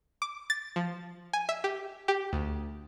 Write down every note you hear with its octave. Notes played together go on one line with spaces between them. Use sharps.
D6
A6
F3
G#5
E5
G4
G4
D2